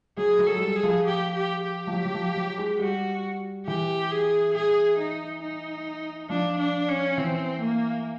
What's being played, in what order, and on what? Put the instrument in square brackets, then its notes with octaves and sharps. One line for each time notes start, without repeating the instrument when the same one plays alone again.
[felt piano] F#3 [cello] G#4
[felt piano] F#3
[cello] A4
[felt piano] G#3
G3
[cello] G#4
[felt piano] F3
[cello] G4
G4
G4
[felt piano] F3
F#3
F#3
F3
F#3
G#3
[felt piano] G3 [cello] F#4
[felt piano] E3 [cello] G4
[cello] G#4
G#4
D#4
D#4
[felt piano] F3 [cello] D4
[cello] D4
C#4
[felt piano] E3 [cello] C4
[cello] A#3